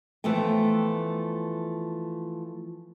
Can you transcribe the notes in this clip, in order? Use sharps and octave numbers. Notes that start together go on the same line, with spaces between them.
E3 F3 A3 B3 G5